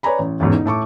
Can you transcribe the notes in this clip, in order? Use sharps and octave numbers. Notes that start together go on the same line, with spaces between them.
B4 C#5 D5 G#5 A#5 B5
A1
A1 E2 G#2 B2
D#4
A2 A5 C#6 D6